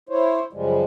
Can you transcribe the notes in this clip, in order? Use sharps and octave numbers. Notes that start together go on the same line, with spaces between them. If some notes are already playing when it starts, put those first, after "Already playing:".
E4 C5 C#5
F#2 C#3 F3 G3 G#3